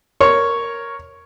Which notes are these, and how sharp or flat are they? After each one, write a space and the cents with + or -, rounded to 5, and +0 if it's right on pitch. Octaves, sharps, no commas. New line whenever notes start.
A#4 +0 C#5 +0